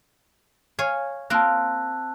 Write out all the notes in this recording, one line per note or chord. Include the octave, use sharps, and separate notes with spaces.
C#5 F5 G#5
A#3 C4 F4 A5 E6 F#6